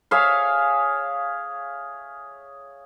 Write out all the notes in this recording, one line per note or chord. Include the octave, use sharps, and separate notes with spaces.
G#4 C#5 E5 F5